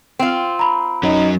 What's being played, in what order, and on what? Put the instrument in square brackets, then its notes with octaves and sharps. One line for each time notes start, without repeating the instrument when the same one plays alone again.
[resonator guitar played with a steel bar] C4 F4
[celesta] A#5 B5
[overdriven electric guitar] F#3 C#4 [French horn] D#4